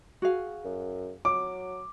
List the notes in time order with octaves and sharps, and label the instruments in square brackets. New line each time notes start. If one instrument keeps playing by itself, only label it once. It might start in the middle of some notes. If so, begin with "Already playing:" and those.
[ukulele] F#4 G#4 F5
[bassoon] F#2
[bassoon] F#3 [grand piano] D6